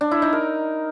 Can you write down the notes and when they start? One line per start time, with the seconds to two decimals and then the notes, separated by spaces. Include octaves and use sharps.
0.01 D4
0.11 E4
0.22 D#4
0.33 A#4